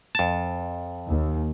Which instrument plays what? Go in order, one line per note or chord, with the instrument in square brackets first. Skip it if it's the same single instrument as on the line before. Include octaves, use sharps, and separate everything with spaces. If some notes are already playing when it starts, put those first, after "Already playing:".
[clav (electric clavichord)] F2 A5
[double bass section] D#2